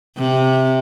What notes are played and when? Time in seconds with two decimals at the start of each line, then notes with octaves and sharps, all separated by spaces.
0.17 C3